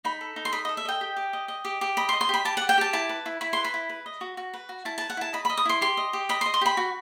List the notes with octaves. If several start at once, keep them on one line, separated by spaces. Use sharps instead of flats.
D#4 B5
A4
D#4
C6
D#5 B5
D#5
A4
E5
D#5 G5
G4
G4
D#5
D#5
G4
G4
D#5 B5
C6
D#5
C6
G4 B5
G4 A5
F#5
G4
G5
G4 A5
E4 A5
B4
E4
E4 B5
B4 C6
B5
E4
B4
D#5
F#4
F#4
B4
F#4
E4 A5
B4 A5
F#5
E4 A5
D#5 B5
B5
D#5
D#6
E4 C6
G4 C6
D#5
G4
D#5 B5
C6
D#5
C6
G4 B5
F#4